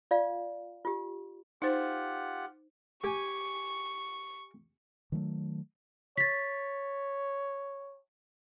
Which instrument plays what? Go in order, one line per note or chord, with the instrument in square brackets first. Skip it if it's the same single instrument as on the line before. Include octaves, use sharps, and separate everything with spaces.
[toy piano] F4 D5 F5
F4 G4
[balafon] D#4 C5 [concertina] F4 G4 F#5
[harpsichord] G4 G#5 [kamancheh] C#6
[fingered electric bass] D#3 F#3 A3
[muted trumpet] C#5 [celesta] A6 B6